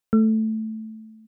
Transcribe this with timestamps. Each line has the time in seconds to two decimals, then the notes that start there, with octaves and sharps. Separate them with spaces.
0.13 A3